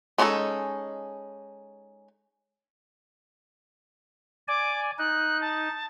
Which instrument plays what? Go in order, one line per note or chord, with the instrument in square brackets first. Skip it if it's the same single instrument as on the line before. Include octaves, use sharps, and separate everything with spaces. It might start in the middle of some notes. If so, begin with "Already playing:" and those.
[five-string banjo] G#3 C#4 D#4 F#4 A4
[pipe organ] D5 G#5 [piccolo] D6
[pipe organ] D#4 [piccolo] F#6
[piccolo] A5